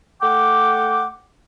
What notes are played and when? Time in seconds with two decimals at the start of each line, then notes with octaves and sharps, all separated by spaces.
0.21 A3 F#5 G5 D6